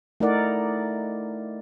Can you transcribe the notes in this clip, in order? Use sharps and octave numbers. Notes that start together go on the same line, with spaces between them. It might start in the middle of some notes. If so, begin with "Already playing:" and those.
A3 D#4 E4 A#4 D5 F#5